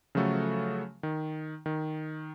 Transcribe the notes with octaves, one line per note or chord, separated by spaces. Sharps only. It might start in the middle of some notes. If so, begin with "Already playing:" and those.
C#3 F3 F#3 A3 F#4 A4
D#3
D#3